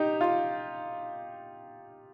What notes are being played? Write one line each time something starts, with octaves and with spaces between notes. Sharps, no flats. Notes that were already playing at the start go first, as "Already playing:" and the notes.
Already playing: D#4 G4
F4